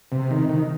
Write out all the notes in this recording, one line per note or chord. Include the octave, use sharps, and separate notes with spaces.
C3
D#3
D#3